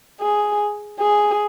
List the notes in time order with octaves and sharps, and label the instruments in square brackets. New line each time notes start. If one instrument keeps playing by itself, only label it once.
[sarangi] G#4
G#4